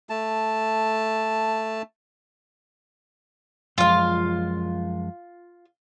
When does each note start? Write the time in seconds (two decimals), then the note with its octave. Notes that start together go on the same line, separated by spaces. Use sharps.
0.10 A3 A5
3.78 F#2 F3 G#3 F4 F5